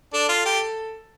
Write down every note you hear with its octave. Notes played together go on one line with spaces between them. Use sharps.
D4 A4
F4
G4